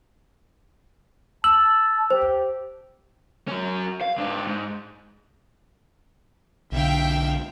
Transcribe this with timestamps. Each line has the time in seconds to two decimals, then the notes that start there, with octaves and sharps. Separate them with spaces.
1.44 A5 E6 F#7
2.10 G4 C5
3.48 F#3 C#4
4.01 F5
4.18 G#2 D4
4.47 G#2
6.72 B1 D3 E5 F5 G5